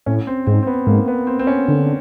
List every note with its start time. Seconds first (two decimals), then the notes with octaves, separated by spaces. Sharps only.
0.06 A2 C#4
0.27 C4
0.46 G#2 C4
0.63 C4
0.67 B3
0.87 G#2 A#3
1.08 B3
1.27 C4
1.39 C4
1.47 C#4
1.68 D3